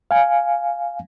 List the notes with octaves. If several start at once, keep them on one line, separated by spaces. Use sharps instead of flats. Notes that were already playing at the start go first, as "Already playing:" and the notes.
F5 G#5